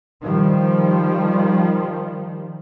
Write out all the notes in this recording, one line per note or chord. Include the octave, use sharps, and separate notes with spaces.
D#3 F3 G3